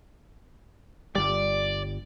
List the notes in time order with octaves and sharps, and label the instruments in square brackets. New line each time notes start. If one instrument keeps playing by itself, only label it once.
[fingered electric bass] G1 G3 [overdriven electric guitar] D5